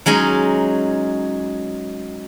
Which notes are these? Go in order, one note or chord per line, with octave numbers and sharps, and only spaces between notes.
F#3 G#3 C#4 D#4